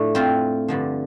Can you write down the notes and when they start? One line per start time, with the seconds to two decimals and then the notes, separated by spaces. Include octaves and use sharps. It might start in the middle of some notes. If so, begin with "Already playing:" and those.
Already playing: A2 F3 A3 D4
0.15 C4 F4
0.68 G2 D3 F3